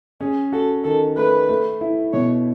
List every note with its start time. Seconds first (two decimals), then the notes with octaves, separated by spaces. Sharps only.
0.20 C#4 G#4
0.52 F#4 A4
0.84 D#3 A4
1.17 A3 B4
1.49 A3
1.81 E4
2.13 B2 C#5